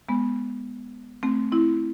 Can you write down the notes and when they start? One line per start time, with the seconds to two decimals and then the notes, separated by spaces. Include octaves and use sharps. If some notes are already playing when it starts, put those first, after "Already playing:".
0.09 G#3 B3
1.23 A3 C4
1.52 C4 E4